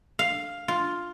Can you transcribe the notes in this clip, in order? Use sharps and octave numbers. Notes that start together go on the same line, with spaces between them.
F5
F4